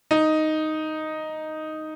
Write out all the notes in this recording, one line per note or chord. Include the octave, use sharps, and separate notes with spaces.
D#4